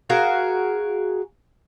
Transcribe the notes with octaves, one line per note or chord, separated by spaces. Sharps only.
F#4 G#4 A#4 F5